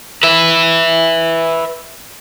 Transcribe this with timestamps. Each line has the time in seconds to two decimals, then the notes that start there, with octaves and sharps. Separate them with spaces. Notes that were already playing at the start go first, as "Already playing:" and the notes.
0.23 B4 E5